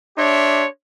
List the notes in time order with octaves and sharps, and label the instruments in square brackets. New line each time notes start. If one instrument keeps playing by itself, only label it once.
[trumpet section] D4 G4 C#5 E5 C6